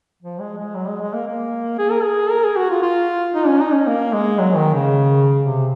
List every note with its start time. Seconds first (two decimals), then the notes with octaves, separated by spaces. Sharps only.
0.23 F3
0.40 G#3
0.57 G#3
0.75 F#3
0.87 G#3
1.01 G#3
1.14 A#3
1.27 A#3
1.79 G#4
1.91 A#4
2.03 G#4
2.30 A#4
2.44 G#4
2.56 F#4
2.70 F4
2.82 F4
3.35 D#4
3.47 C#4
3.61 D#4
3.73 C#4
3.87 A#3
4.13 G#3
4.39 F#3
4.56 D#3
4.74 C#3
5.42 C3